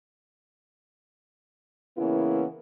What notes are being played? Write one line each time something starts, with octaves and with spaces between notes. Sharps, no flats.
C#3 E3 A#3 B3 C#4 E4